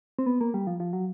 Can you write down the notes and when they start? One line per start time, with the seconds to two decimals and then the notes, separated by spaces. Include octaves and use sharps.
0.19 C4
0.26 B3
0.41 A#3
0.54 G3
0.67 F3
0.80 F3
0.93 F#3